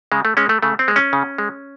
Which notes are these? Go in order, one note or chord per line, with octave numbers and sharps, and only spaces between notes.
C#3 G#3
A3
G#3 C#4
A3
C#3 A3
C4
G#3
C#4
C#3
G#3